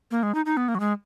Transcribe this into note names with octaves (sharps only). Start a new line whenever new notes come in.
A#3
G#3
D#4
D#4
B3
A#3
F#3
G#3